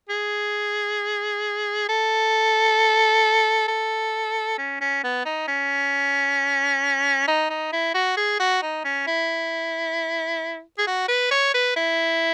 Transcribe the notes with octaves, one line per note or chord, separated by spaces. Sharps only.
G#4
A4
A4
C#4
C#4
B3
D#4
C#4
D#4
D#4
E4
F#4
G#4
F#4
D#4
C#4
E4
G#4
F#4
B4
C#5
B4
E4